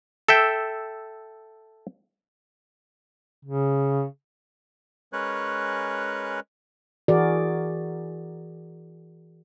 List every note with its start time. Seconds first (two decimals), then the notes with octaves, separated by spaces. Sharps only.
0.29 A4 E5 G5
3.45 C#3
5.13 G#3 C#4 A#4 B4 C#5 F#6
7.08 E3 F#4 G#4 A#4 D5